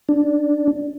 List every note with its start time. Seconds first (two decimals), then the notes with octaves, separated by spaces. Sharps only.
0.09 D4